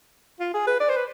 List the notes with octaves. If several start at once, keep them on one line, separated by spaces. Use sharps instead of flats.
F4
G#4
B4
D5
C5
B4